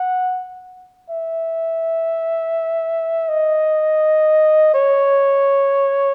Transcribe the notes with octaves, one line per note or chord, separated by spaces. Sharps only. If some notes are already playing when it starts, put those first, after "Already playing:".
Already playing: F#5
E5
D#5
C#5